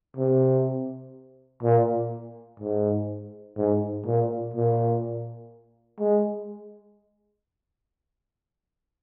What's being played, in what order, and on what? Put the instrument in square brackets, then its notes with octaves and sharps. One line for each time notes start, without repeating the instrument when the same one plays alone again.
[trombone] C3
A#2
G#2
G#2
A#2
A#2
G#3